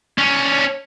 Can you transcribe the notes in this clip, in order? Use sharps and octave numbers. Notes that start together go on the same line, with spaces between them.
C#4 D4